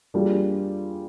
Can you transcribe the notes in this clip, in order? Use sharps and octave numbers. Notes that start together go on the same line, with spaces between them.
G3 A#3 D4 F4 G#4